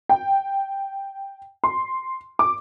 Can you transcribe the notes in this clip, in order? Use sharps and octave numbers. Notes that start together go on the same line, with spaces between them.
G5
C6
D6